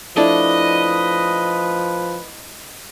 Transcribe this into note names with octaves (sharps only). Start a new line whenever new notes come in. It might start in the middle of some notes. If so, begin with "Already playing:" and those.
F3 A3 D4 E4 B4 D#5